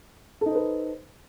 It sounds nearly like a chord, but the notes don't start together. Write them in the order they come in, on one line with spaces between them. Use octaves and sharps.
A4 D#4 C5 B4